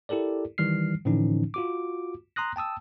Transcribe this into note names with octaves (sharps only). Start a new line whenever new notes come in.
E4 G4 A4 A#4 D5
D#3 E3 G3 F6 C7
A2 D3 E3 F3 C#4 D#4
F4 F#4 D6
A#5 C6 D#6 F#6 A#6
G5 A5 D#6 E6